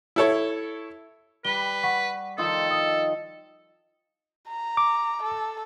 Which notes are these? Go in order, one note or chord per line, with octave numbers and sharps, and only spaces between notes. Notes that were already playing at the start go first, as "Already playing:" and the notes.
E4 A4 C#5
G3 B4 G7
F#5 C#6 B6
D#3 F3 A4 C6 D#6
D#5 D#6
A#5
D6
A4